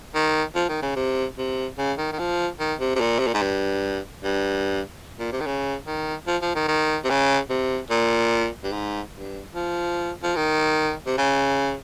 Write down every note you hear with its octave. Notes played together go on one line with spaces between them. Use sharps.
D#3
F3
D#3
C#3
C3
C3
C#3
D#3
D#3
F3
D#3
C3
C3
A#2
C3
A#2
G#2
G2
G2
A#2
C3
D#3
C#3
D#3
F3
F3
D#3
D#3
C3
C#3
C3
A#2
G2
G#2
G2
F3
F3
D#3
C3
C#3